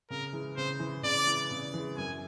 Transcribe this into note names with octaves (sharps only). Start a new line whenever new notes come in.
C#3 A#4
E3 G#3
C#3 C5
E3 G#3
C#3 D5
E3 G#3
C#3
E3 G#3
F#2 G#5